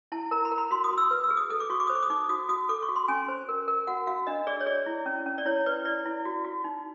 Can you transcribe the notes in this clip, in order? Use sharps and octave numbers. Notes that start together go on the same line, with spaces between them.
E4 A5
A#4 A#5
B5
A#4
B5
F#4 C6
D#6
F#4
E6
B4
E6
G#4
D#6
A4 D#6
D6
F#4 C#6
D6
C5 D#6
D6
D#6
D#4 D6
F#4 D#6
F#4 D#6
A4 D6
C#6
F#4
C6
C#4 G#5
C5
A#4
A#4
F#4 F#5
F#4 F5
D4 D#5
G#4 D5
C#5
G#4 D5
E4
C#4
C#4
D5
E4 C#5
B4 D5
E4 D5
E4
F#4
F#4
D#4